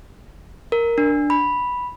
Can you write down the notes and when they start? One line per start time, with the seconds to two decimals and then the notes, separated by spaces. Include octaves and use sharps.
0.72 A#4
0.98 D4
1.30 B5